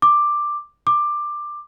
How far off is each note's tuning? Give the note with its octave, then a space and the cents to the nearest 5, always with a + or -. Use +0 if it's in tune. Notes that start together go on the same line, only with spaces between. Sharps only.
D6 +10
D6 +15